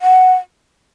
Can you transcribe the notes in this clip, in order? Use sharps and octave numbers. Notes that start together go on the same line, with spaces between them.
F#5